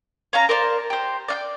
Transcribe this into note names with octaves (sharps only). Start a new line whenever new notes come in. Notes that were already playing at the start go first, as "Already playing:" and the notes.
C#4 F5 A#5
A#4 C5 D5 A5
G4 C5
D5 F5 G5